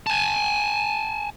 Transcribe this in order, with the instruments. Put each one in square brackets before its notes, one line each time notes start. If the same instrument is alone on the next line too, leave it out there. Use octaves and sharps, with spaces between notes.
[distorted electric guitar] G#5 A5